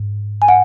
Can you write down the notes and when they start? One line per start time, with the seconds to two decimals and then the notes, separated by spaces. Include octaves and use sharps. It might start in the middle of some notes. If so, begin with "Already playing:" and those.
Already playing: G#2
0.42 G#5
0.48 F#5